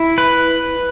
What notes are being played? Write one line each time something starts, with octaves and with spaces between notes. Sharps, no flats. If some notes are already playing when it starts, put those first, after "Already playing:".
Already playing: E4
B4